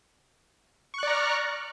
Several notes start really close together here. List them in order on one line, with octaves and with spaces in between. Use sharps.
C#6 F#6 D5 A#5 F6